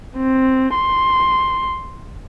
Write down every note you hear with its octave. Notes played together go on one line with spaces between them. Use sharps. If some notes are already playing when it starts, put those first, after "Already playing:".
C4
C6